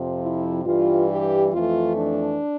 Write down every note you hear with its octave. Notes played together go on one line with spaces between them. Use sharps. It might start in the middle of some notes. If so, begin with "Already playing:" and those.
Already playing: F2 C3 F3
E4
G2 E3 G3 F4
G4
F2 E3 A3 F4
D4